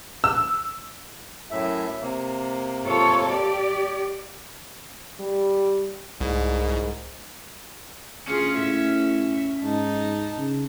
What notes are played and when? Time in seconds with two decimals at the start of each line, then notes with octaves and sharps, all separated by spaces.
0.24 E6
1.51 F#2 A2 E5
2.02 C3 A#3
2.85 F4 A4 C#5
3.30 G4 D5
5.20 G3
6.21 C2 G#2
8.28 D2 C#4 F4 G#4
8.57 A2 E5
9.62 G#2 D#4 A5
10.37 C#3